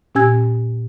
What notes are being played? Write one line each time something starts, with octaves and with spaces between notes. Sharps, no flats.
A#2 C#4 G4 G#5 E6 G#6